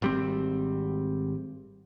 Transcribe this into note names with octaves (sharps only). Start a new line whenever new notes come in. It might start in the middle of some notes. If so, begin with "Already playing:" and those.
G#1 G3 C4